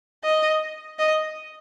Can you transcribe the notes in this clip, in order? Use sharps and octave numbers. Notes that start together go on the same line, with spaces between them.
D#5
D#5